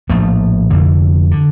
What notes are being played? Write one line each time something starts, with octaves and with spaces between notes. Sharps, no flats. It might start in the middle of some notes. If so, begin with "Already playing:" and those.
A#1 A2 F3 A3
F1 F2 D3
D3